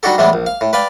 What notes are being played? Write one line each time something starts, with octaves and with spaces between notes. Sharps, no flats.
G3 D4 D#4 F#4 G4 A4
A2 E3 G3 G#3 B3
A#1
F5
A2
B4 D5 F5 G5